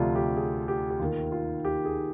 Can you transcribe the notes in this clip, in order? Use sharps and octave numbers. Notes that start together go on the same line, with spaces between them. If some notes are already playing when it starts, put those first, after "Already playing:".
Already playing: D2 C3 F3 D4 F4
G4
G#4
G4
G4
D#2 D#3 F4
F4
G4
G#4